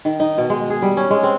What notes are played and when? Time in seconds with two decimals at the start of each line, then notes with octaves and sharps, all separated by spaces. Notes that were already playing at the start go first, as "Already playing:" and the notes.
0.05 D#3
0.20 D#4
0.38 B2
0.50 G#3
0.70 G#4
0.82 G3
0.97 C#4
1.10 G#3
1.23 C4